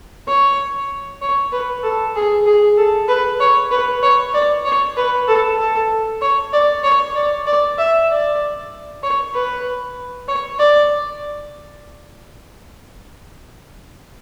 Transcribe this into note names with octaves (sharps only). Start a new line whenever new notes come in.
C#5
C#5
B4
A4
G#4
G#4
A4
B4
C#5
B4
C#5
D5
C#5
B4
A4
A4
C#5
D5
C#5
D5
D5
E5
D5
C#5
B4
C#5
D5